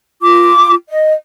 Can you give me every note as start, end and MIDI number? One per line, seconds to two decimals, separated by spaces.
0.22 0.74 65
0.22 0.74 86
0.89 1.13 75